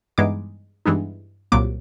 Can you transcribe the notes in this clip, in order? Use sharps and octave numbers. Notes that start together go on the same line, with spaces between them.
G2 E3 G#3 B3 D#4 D6
G2 E3 G#3 B3 D#4
C2 A#2 F#3 A#3 D6